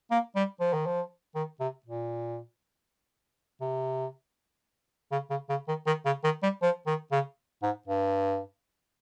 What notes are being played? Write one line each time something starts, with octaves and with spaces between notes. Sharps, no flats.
A#3
G3
F3
D#3
F3
D#3
C3
A#2
C3
C#3
C#3
C#3
D#3
D#3
C#3
D#3
G3
F3
D#3
C#3
G#2
G2